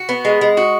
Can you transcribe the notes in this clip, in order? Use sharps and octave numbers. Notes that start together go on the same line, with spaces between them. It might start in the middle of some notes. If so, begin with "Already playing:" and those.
Already playing: F#4
B3
G#3
G#3
F#4